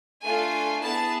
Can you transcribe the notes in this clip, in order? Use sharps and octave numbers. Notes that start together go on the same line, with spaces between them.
A3 D4 F4 A4 G#5
B3 E4 G#4 A5